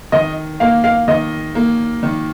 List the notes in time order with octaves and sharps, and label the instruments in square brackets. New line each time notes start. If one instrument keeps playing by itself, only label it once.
[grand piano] D#3 [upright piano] D#5
[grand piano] A#3 [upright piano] F5
[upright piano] F5
[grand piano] D#3 [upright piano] D#5
[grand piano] A#3
D#3